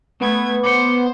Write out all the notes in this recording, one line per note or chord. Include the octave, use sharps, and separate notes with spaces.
A3 B3 G#6
C5 D6 C#7